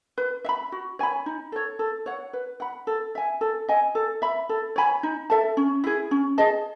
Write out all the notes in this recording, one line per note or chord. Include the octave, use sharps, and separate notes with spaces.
B4
E5
B5
F#4
C#5 G#5 B5
D#4
A4 C#5
A4
C#5 F#5
B4
F#5 B5
A4
E5 G#5
A4
D#5 G#5
A4
E5 B5
A4
C#5 G#5 B5
D#4
A4 E5 A5
C#4
E4 G#4
C#4
G#4 D#5 A5